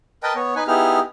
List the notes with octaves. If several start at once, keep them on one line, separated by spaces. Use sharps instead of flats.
A#4 B4 D#5 G5 A5
B3 C#5
D#4 B4 G#5
B3 D#4 E4 G4 G#4 F6